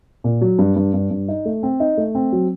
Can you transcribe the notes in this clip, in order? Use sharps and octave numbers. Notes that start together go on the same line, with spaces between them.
A#2
F#3
G2
G2
G2
G2
D#4
A3
C4
D#4
A3
C4
F#3